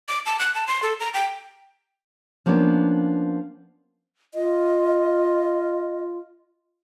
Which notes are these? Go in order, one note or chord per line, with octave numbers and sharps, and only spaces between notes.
D6
A5
F#6
A5
C6
A4
A#5
G5
F3 A#3 B3 C#4 D4
F4 D#5